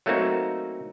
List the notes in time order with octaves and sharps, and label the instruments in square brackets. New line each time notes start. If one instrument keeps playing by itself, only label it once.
[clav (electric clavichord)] F#3 A3 A#3 C4 D#4 F#4